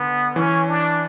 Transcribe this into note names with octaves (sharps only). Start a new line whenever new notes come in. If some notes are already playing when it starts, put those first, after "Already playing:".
Already playing: D3 B3
E3 C#4
D4